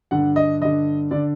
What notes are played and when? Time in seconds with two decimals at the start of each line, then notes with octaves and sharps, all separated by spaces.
0.11 G2 D3 F#5
0.36 D#5
0.61 G2 D3 D#5
1.11 D3 D5